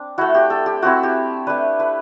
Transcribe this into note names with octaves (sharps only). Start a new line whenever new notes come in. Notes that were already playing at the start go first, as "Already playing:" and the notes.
Already playing: C4 D4
A3 E4 F#4
G4
A4
G4
A3 C4 E4 F#4
G4
A3 D4 B4
B4